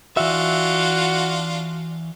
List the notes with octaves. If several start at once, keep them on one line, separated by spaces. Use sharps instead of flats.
E3 D4 F4 F#4 E5